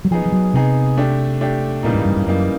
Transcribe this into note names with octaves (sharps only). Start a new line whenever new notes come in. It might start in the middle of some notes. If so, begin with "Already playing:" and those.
F#3
F3 B3 D#4 G#4
F3
F#3
C3 B3 D#4 G#4
A3 D4 G4
A3 D4 G4
A#2 C#3 E3 G3 A#3 D#4
G#2
G2
G2
F#2 C#3 E3 G3 A#3 D#4